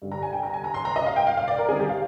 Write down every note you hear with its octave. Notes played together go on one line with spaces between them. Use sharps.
G2 D3 G3
A#5
G#5
G5
A#5
G#5
A#5
C6
A#5
D#5
F5
G5
F5
F5
D5
A#4
D#3 G3 C4 D#4 G#4
G4
F5